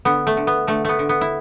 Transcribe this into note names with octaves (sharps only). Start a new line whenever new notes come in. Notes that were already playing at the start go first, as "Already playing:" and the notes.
D3 B3
A3
D3
B3
D3 A3
A3 B3
D3
B3
E4